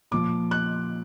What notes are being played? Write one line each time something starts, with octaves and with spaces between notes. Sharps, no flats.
A#2 F3 D6
F#6